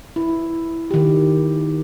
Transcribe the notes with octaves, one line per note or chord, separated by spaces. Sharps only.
E4
D#3 G4